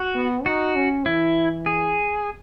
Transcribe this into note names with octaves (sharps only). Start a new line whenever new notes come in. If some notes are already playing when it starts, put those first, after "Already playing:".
Already playing: F#4
B3
D#4 F#4
C#4
E3 E4
G#4